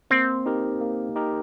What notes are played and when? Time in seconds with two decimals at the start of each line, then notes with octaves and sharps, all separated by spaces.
0.10 A#3 C4
0.46 D#4 G4 A#4
0.81 A#3
1.16 D#4 G4 A#4